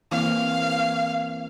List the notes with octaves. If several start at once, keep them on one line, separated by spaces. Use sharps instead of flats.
E3 A#3 C4 F5